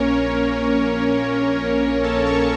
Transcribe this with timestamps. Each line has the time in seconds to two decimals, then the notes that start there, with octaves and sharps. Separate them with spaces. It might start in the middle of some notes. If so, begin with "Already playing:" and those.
Already playing: A#1 A#3 C#4 A#4 C#5
0.34 A#3
0.77 A#3
1.19 A#3
1.63 A#1
2.04 A#3 A4 A5
2.26 C#5 C#6